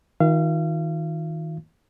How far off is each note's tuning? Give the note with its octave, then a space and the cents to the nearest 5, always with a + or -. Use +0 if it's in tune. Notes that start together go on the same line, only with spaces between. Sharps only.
D#3 +30 F4 +45 F5 -35